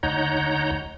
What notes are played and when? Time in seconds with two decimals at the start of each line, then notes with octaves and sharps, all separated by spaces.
0.03 D2 D#4 C#5 F#5 A#5 G6